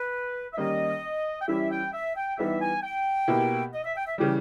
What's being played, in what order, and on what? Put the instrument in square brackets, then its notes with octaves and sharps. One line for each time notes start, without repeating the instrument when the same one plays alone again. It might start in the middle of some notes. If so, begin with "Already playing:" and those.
Already playing: [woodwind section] B4
E5
[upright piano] D#3 G3 A#3 C#4 G4 [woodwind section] D#5
[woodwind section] G5
[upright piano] E3 G3 C#4 E4 G4 [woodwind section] E5
[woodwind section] G5
E5
G5
[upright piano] E3 G3 B3 D#4 G4 [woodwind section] E5
[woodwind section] G#5
G5
[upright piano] B2 A#3 E4 G4
[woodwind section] D#5
E5
G5
E5
[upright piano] C#3 E3 G3 [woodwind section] G4